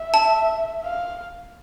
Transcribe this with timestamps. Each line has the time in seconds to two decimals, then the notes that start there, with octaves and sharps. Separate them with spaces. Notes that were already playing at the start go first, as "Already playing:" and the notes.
Already playing: E5
0.14 A5
0.84 F5